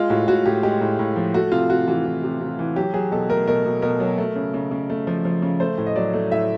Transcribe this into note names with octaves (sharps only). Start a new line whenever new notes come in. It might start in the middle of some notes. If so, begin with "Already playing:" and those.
Already playing: G#3 F4
A2 F#4
A2 F#4
A2 G4
G#3 G4
A2
A2
F3
A3 F#4
C3 F4
C3 F#4
E3 F#4
E3
C3
C3
E3
F#3 G4
F#3 G#4
B2 A4
A3 A#4
B2 A#4
B2
B2 A#4
F#3
A3
C#3
C#3
C#3
A3
F3
F3
C#3
A3 C5
A2
D#5
F#3 D5
A3
A2 E5